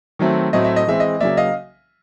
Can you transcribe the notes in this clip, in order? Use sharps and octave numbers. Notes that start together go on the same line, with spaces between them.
D#3 F#3 A3 C4
A2 F#3 A3 C4 D#5
E5
D#5
E3 G#3 C4 E5
D#5
C#3 F#3 A#3 D5 E5
D#5 F5